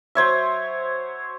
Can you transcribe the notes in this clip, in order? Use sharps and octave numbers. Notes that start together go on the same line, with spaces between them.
F#3 C5 C#5 E5